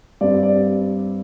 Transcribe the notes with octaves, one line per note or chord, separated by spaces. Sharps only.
G2 G3 C4 D5
D5